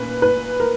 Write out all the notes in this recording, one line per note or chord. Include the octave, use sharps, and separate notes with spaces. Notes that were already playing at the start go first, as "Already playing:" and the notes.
Already playing: A#2 A#3 C#4 B4
B4
A#4